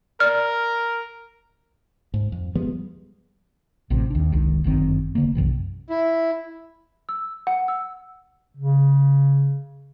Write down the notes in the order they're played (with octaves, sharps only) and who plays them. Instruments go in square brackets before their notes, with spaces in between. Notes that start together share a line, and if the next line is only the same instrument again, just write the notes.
[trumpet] A#4 [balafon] D5 [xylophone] F6
[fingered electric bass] G#2
F2
F3 G3 G#3 B3
[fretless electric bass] A1 A2 C3
D#2 D4
F1 C2 D#3 G#3
G1 F#2 D#3 C4
E1 D3 A#3
B1 F#2 C3 E3
[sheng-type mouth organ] E4
[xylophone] E6
F#5
E6
[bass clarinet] C#3